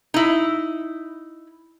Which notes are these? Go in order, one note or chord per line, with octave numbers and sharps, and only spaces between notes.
D#4 E4